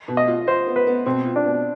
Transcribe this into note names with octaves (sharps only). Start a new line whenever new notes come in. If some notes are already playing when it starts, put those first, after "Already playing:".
B2
D#5
F4
F4 C5
B3
B4
B3
B2 C4
F4
D4
B2